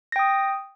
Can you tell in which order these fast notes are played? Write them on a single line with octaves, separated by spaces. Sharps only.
A#6 G5 D#6